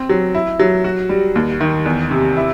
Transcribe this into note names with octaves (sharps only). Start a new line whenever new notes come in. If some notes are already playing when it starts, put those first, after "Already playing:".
Already playing: C4
F#3
E4
F#3
F#4
G3
D#2
D#3
E2
C3
E4